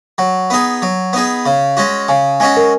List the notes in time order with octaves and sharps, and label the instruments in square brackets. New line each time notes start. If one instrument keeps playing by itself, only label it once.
[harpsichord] F#3 [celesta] F#5
[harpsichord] B3 D#4 G#4
F#3
B3 D#4 G#4
C#3
G#3 C#4 F#4
[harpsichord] C#3 [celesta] G#5
[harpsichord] G#3 C#4 F#4 [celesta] G#5
[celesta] A#4